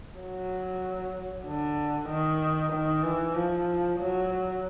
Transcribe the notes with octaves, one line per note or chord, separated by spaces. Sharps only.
F#3
D3
D#3
D#3
E3
F3
F#3